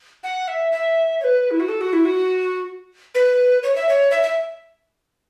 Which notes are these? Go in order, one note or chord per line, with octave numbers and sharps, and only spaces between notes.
F#5
E5
E5
C#5
B4
E4
F#4
A4
F#4
E4
F#4
B4
C#5
E5
C#5
E5
E5